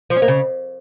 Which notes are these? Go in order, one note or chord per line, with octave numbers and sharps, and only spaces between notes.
F3
C#4
A#3
C#3